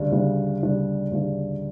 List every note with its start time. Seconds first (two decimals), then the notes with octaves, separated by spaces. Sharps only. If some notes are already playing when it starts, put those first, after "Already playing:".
Already playing: D2 C#3 G3 D4
0.12 D2 C#3 G3 D4
0.62 D2 C#3 G3 D4
1.12 D2 C#3 G3 D4